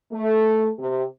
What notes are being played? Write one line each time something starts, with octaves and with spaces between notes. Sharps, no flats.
A3
C3